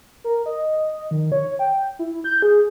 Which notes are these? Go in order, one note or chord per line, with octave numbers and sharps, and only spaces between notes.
A#4
D#5
D#3
C#5
G5
E4
G6
G#4